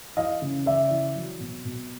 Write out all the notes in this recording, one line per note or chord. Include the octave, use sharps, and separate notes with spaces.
E3 D#5 F5
C#3
C#3 D5 E5
E3
F#3
B2
B2